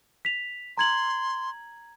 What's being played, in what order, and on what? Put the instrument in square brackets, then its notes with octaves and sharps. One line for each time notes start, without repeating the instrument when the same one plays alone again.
[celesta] B6 F7
[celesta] A#5 G#6 F#7 [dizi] C6